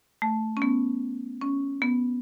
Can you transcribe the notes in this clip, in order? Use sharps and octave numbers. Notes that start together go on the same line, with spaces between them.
A3
C#4
B3
C#4
B3